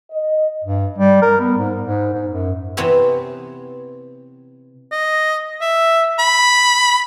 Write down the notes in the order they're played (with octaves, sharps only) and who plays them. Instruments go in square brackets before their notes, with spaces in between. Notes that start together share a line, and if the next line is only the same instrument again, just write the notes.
[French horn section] D#5
[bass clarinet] G2
G3
A#4
B3
G#2
G#2
G#2
F#2
[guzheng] C3 E3 B3 G4 C#5 E5
[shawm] D#5
E5
B5